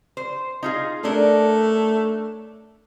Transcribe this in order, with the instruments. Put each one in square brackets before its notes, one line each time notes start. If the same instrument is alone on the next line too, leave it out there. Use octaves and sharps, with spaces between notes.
[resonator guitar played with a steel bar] C5
D#4 F4 G#4
[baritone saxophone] A3 [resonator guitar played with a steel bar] C#4 D4 A#4